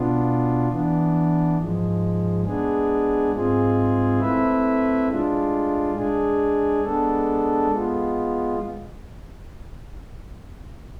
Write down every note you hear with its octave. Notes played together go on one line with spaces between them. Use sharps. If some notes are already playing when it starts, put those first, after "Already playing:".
Already playing: B2 B3 D4 F4
E3 B3 D4
G#2 F3 G#3
G#3 B3 D4 G#4
G#2 G#3 C4 F4 G#4
A3 C4 E4 B4 E5
A2 G#3 D4 F4
G#3 D4 G#4
G#3 B3 D4 A4
G#3 B3 F4